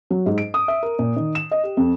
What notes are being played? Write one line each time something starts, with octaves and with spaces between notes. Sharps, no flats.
F#3
G#2
D7
D#6
E5
A#4
A#2
D#3
E7
D#5
G4
F2